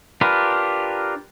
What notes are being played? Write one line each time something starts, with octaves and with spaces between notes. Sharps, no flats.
D4 F4 G4 A#4 B4